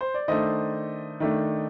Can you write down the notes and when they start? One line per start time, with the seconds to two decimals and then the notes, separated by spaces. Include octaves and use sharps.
0.01 C5
0.14 D5
0.28 D#3 A3 D4 C5 D#5
1.20 D#3 A3 D4